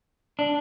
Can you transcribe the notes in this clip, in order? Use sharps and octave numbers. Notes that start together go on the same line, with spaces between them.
D4